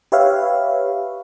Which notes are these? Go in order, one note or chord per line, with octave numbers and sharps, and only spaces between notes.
G4 B4 C#5 E5 F5